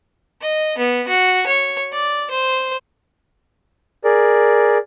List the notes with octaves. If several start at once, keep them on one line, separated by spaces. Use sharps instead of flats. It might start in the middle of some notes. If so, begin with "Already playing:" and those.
D#5
B3
F#4
C#5
D5
C5
G#4 A#4 D5